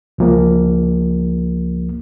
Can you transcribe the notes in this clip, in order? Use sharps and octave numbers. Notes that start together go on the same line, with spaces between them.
C#2 F3 A#3